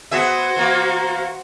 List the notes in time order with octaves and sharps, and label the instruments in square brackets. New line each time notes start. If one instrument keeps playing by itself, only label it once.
[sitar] B3 G#4 E5 [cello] F#4 C5
[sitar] E3 A#3